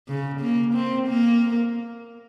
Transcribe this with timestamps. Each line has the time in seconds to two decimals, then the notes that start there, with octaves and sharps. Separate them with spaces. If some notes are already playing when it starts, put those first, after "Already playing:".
0.08 C#3
0.41 A#3
0.74 C4
1.08 A#3